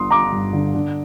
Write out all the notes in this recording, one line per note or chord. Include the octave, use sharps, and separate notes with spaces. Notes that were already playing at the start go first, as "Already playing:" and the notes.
Already playing: G1 G2 D3 C6 D#6
G3 A#5 D6
G2
D3
D3